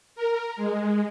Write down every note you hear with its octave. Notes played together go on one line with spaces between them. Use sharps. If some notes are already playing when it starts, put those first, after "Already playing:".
A#4
G#3